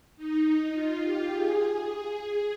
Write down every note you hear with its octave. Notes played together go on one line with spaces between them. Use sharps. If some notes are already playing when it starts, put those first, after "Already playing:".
D#4
F4
G4
G#4